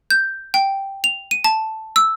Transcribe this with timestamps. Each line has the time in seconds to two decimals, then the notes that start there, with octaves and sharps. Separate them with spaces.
0.10 G6
0.54 G5
1.04 F7
1.31 D#7
1.44 A5
1.96 E6